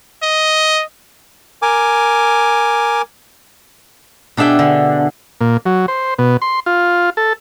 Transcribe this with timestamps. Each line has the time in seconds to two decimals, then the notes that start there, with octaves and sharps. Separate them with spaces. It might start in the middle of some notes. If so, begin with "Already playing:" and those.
0.22 D#5
1.62 A#4 G#5 D6
4.37 B2 D4 G#4 E5 G5
4.59 D3
5.41 A#2
5.66 F#3
5.88 C5
6.18 B2
6.42 C6
6.66 F4
7.17 A4